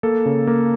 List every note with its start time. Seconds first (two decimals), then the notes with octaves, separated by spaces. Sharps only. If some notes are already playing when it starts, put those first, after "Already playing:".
0.03 A#3 A4
0.26 C#3
0.47 A#3